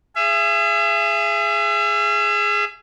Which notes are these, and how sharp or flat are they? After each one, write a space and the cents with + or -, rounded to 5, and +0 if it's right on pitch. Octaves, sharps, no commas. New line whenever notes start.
G#4 +0 E5 +40